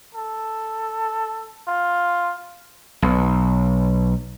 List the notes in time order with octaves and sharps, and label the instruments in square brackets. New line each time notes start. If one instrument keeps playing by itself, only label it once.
[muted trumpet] A4
F4
[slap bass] B1